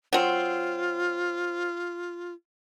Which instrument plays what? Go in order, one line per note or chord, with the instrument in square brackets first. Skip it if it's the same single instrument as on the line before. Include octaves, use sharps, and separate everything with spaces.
[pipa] F#3 C4 [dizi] F4